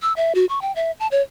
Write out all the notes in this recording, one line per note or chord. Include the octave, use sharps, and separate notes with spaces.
E6
E5
F#4
C#6
G5
E5
A5
C#5